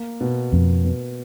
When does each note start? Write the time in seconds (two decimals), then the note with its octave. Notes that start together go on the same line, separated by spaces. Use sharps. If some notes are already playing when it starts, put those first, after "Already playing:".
Already playing: A#3
0.21 B2
0.52 F2 B2
0.84 B2